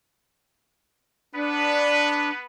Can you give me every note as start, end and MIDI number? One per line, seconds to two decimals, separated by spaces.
1.35 2.45 59
1.35 2.30 62
1.35 2.45 71